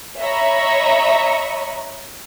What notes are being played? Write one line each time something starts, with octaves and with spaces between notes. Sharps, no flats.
C#5 D#5 E5 A#5 B5 C#6